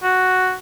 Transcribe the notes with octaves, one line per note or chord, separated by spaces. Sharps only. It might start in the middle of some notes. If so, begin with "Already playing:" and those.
F#4